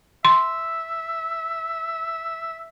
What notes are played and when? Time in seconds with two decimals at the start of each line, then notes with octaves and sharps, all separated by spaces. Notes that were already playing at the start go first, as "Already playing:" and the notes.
0.25 E5 C6